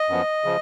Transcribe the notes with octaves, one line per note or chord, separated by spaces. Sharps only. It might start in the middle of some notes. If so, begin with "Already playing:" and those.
Already playing: D#5
F#2 F3 B3
C#3 F3